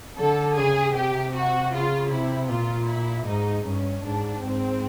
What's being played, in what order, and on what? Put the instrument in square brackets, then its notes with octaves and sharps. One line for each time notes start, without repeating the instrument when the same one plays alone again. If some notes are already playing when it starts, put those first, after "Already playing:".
[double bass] D3 [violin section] A4
[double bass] C#3 [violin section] G#4
[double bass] C3 [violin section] G4
[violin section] F#4
[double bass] C#3 [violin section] F4
[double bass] C3 [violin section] E4
[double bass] A#2 [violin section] F4
[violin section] E4
[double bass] G#2 [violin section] D#4
[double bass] G2 [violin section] C#4
[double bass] G#2 [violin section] D4
[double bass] G#2 [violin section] C4